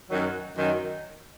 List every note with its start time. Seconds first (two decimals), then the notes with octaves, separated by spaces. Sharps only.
0.10 F#2 D#3 F#3
0.55 F#2 D#3 F#3